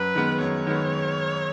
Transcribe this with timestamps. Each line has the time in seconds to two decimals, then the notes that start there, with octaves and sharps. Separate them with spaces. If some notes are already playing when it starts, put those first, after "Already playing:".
Already playing: F#2 B4
0.15 D#3 G#3 B3
0.41 F#2 C#5
0.67 D#3 G#3 B3